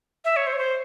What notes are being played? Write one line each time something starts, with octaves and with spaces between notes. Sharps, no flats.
E5
C#5
C5
C#5
C5